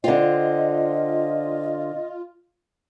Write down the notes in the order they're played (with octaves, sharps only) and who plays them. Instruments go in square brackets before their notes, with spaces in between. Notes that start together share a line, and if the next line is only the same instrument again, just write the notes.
[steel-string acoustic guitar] D3 C4 [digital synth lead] F4 [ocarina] D#5